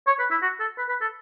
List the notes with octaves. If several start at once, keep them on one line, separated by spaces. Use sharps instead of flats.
C#5
B4
E4
F#4
A4
B4
B4
A4